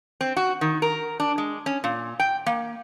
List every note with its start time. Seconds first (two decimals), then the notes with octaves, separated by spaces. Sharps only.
0.21 C4
0.37 F#4
0.61 D#3
0.82 A#4
1.20 D4
1.38 G#3
1.66 C#4
1.84 A#2
2.20 G5
2.46 A#3